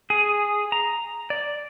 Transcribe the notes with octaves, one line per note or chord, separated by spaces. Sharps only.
G#4
A#5
D5